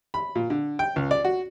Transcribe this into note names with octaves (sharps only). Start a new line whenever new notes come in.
B5
A#2
D3
G5
C#2
D5
F#4